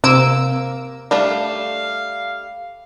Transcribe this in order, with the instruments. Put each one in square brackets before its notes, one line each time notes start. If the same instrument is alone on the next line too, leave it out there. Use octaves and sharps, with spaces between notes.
[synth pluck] C3 E6 D7 [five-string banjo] A#3
[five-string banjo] G3 A3 D4 [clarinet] F5